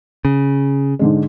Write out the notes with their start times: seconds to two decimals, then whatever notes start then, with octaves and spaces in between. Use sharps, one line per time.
0.25 C#3
0.99 G#2 D3 G#3